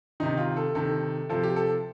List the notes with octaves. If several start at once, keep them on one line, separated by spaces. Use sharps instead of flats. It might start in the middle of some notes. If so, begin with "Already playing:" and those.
C3 D#3 D#4
F4
A4
C3 D#3 A4
C3 F3 A4
G4
A4